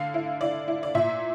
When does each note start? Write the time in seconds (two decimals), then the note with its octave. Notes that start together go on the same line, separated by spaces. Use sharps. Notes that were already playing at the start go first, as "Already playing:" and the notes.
Already playing: D3 F5
0.14 E4
0.41 E4 D5
0.68 E4
0.83 D5
0.95 A#2 E5